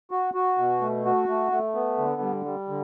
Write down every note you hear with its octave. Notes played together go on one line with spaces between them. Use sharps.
F#4
F#4
B2
A3
F#4
A3
A3
B3
D3
G3
G3
D3